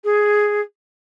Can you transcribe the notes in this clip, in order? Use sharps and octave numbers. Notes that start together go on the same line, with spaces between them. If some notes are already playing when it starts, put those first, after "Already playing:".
G#4